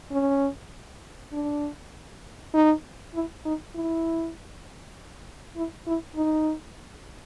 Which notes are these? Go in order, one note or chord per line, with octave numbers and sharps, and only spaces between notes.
C#4
D4
D#4
E4
D#4
E4
E4
E4
D#4